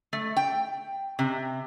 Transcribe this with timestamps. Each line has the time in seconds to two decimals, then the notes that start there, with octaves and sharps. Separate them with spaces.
0.13 A3
0.36 G5
1.19 C3